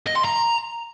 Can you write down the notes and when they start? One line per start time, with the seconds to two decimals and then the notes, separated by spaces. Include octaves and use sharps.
0.07 D#5
0.16 C6
0.25 A#5